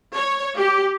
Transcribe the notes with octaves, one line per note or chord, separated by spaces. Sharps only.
C#5
G4